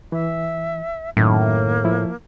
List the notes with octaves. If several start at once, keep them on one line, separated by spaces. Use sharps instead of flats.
E3 E5
F#2 A2 D#3 A#3
F3 E4